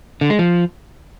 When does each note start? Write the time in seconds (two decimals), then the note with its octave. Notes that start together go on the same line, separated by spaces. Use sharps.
0.21 D3
0.30 G#3
0.39 F3